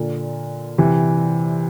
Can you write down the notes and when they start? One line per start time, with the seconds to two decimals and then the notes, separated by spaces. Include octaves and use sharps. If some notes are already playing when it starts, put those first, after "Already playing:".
Already playing: A#2 D3
0.78 C3 E3